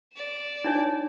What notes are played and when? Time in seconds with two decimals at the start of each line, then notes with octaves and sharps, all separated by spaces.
0.14 D5 E7
0.64 D4 D#4 C#5